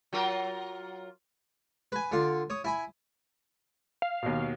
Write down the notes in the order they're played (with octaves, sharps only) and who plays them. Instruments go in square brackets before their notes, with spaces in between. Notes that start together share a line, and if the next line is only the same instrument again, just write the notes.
[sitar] F#3 F4 A#4
[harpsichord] B4 G#5
D3 F4
C#5 D#6
E4 G#5 B5
[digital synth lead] F5
[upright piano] D#2 B2